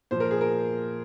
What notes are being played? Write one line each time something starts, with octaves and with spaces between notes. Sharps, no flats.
A#2 F3 C5
A#4
G#4
A#4